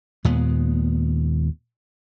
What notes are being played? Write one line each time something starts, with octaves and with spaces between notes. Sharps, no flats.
D#2 A#2 G#3 B3